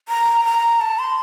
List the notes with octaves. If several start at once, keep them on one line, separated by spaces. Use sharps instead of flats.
A#5
A#5
A5
C6